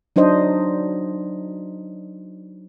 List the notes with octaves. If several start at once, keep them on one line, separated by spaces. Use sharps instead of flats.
F#3 D4 D#4 C5 D#5